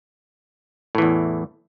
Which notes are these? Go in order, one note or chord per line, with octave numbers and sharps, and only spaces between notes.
E2 A2 E3